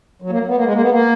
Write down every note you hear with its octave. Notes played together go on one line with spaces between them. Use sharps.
F#3
A#3
B3
A#3
G#3
A#3
B3
A#3